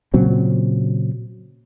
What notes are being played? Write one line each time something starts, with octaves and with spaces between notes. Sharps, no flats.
A#2 C#3 F#3 C4